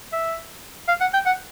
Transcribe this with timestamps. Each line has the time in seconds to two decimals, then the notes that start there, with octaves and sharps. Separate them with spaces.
0.13 E5
0.88 F5
1.01 F#5
1.13 G5
1.26 F#5